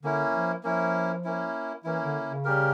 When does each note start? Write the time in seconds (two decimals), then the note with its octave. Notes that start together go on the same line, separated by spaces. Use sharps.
0.03 D3 A#3 C#4 E4
0.34 F3
0.63 F3 A#3 C#4 E4
1.24 A#3 C#4 E4
1.84 E3 A#3 C#4 E4
2.04 D3
2.24 C#3
2.45 G3 C#4 G4 A#4